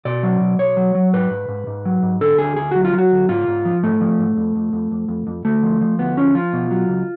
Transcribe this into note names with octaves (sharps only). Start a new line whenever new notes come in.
B2 D5
F#3
B2
B1 C#5
F#3
F#3
G#2 B4
G#2
G#2
G#2
F#3
G#2
D3 A4
D2 G#4
D2 G#4
F#3 F#4
F4
F#3
F#4
D2
G#2 F4
G#2
F3
G#2 A3
F3
G#2
F2
F2
F2
F2
F2
F2
D2 A3
F3
F3
D2 B3
F3 C#4
F3 F4
B2
F#3
C#2